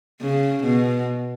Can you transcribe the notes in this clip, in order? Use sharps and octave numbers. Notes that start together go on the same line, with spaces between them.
C#3
B2